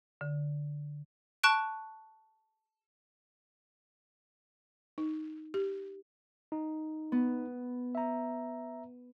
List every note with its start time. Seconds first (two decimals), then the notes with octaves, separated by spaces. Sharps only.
0.21 D3
1.43 A5 C#6 F#6 D7
4.98 D#4
5.54 G4
6.52 D#4
7.12 B3
7.95 E5 A#5